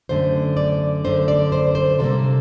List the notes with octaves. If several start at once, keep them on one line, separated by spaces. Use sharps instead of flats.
F#2 D3 A3 C5
D5
F#2 D3 A3 C5
D5
C5
C5
C3 G3 A#3 A4